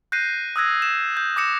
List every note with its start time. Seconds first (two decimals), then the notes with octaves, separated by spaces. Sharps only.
0.12 F#6 G6 A#6 C7 D#7
0.56 D#6 E6 F#6 G#6 A#6
0.82 E7
1.17 G6
1.36 D6 D#6 A#6 C#7 E7